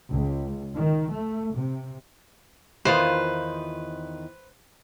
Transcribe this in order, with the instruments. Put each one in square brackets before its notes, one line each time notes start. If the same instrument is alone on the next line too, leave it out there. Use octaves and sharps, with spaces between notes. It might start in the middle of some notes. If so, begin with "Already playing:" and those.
[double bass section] C#2
D#3
A3
C3
[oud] E2 D#3 F4 [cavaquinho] B4 C5